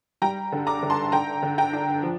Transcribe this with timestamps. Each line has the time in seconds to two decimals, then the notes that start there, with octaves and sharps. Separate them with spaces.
0.22 G3 G5 A#5
0.52 D3
0.67 A#5 D6
0.83 D3
0.90 A5 C6
1.12 D3 G5 A#5
1.42 D3
1.58 G5 A#5
1.73 D4
2.03 F3